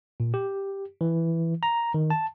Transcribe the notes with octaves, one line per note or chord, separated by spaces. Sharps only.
A#2
G4
E3
A#5
D#3
A5